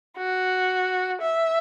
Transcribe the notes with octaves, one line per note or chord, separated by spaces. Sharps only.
F#4
E5